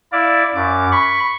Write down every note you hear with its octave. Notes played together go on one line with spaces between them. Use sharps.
E4 D5 F5
F#2 D6
B5 C#6